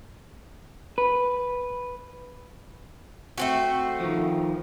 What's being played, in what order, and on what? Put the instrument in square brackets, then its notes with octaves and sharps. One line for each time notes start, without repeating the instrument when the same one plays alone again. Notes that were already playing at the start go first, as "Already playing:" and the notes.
[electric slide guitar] B4
[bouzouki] A3 C4 F#4
[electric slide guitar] D#3 F3